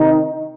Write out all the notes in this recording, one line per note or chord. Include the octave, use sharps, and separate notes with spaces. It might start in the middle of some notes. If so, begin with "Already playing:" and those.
Already playing: C3 D#3 D#4